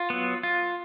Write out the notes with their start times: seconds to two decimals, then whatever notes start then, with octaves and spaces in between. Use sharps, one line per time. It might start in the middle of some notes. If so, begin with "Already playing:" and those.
Already playing: F4
0.10 F#3 B3
0.43 F4